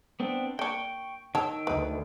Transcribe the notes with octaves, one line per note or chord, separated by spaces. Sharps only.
B3 C4 D4
A#3 D4 G5 C#6
D#3 C#5 A5 E6
D2 D#4 B4